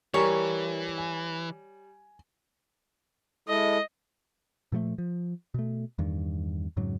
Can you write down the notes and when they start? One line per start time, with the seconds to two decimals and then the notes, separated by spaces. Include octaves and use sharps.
0.14 E3 G3 A#4 C#5 G#5 A#5
0.98 G#5
3.49 G#3 E4 A4 D#5
4.72 A#2 F3 F#3 A3
4.98 F3
5.54 B2 A3
5.98 E2 G2 D#3
6.77 F2 G#2 C#3 F#3